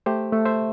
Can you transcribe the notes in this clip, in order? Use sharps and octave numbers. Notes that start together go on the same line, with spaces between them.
A3 G4 C5
A3
C5 E5